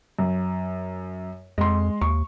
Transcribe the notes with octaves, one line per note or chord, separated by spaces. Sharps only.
F#2
F2 G#3 C6
D#2 C#6